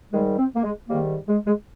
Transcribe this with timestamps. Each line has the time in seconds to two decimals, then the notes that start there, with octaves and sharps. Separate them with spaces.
0.12 G#2 D#3 G3 G#3
0.38 C4
0.55 A#3
0.64 G#3
0.89 G#2 D#3 G3 A#3
1.27 G#3
1.46 G#3